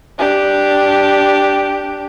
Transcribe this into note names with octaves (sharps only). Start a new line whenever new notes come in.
D4 G4